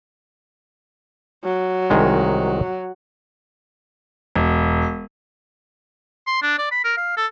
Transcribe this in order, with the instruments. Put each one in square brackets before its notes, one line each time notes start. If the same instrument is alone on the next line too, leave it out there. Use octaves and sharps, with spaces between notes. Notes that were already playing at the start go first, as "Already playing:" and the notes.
[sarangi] F#3
[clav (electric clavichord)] C2 D#3 G#3
[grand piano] E1
[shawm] C6
D4
D5
B5
A#4
F5
A4